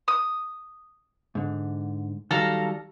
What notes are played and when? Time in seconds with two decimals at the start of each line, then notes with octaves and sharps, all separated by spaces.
0.08 D#6
1.35 G#2 D3
2.31 D#3 F#3 G3 A4 F5 A#5